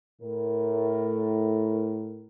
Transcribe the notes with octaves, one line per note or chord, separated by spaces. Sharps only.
A2 A#4